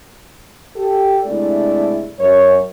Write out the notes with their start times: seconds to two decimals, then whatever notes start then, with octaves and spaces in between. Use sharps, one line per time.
0.76 G4 A4
1.24 C3 G#3 A3 D4 E4 D5
2.19 F#2 C#5